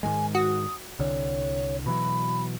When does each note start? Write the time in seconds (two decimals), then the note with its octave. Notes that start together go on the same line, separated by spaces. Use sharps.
0.03 G#2 D#3 G#3 G#5
0.35 F#4 D#6
0.99 C2 D3 C#5
1.86 B2 E3 F#3 B5